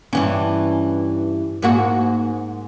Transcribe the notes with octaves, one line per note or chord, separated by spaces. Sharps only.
G2 E3 C#4
G#2 A#3 F#4